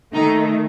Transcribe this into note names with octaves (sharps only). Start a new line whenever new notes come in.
D#3 A3 D#4